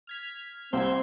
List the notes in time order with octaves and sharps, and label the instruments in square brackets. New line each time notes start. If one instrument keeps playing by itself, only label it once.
[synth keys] F6 G#6 B6
[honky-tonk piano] C2 C3 [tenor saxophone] C4 [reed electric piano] C5 [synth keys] C6 E6 G#6